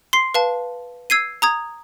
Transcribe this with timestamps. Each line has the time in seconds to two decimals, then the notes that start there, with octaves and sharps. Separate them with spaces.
0.13 C6 C7
0.34 B4 F5 A5
1.10 E6 G#6 C7 D#7
1.42 A#5 D#6 G#6